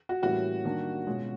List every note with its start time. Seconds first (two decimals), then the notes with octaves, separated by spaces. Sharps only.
0.09 F#4
0.22 A2 E3 G3 A#3 C#4 F#4
0.64 D#3 G3 A#3 D4
1.07 B2 G#3 C#4 F4